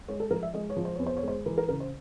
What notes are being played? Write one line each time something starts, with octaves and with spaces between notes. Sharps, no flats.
G#3 C#5
A4
F3 A#4
E5
G#3 D#5
C#5
F3
C5
E2 C#5
C5
C#5
G#3 C5
E3 A#4
A#4
C#3 A#4
C5